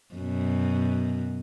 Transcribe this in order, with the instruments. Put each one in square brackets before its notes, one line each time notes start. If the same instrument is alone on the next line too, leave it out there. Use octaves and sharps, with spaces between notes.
[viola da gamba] F#2 B2